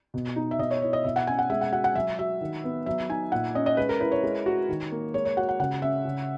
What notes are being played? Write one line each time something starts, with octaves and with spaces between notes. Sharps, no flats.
B2
D#4
E5
B2 D#5
C#5
E4 C#5
D#5
B2 E5
F#5
C#4 G#5
F#5
G#3 E5
F#5
F#4 F#5
F#5
F#3 E5
F#4 E5
D#3
B3
F#3 E5
D#4 G#5
A#2 F#5
C#4 D#5
D#5
G#3 B4
A#4
E4 B4
C#5
G#3
F#4
D#3
A#3
G#3 C#5
C#5
F#4 F#5
F#5
C#3 F#5
C#4 E5
C#3